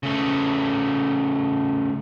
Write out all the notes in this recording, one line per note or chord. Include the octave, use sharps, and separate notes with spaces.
C#3 A3